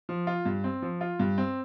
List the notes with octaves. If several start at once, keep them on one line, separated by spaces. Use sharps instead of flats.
F3
F4
G2
C4
F3
F4
G2
C4